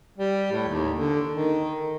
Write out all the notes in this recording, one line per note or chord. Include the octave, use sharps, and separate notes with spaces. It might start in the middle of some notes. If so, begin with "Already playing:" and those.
G3
A2
D#2
D3
D#3